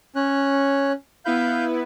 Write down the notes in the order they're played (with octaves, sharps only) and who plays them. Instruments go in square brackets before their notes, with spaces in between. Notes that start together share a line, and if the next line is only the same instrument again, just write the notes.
[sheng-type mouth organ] C#4 C#5 F#6
[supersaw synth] B3 E4 B4 [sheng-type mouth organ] F5 G6